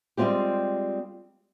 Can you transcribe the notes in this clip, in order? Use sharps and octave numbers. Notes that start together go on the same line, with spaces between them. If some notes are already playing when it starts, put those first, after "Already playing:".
G3 G#3 A#3 C4 F4 G4